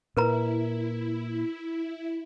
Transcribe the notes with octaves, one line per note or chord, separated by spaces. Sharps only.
A#2 E4 A#4 B4 A#5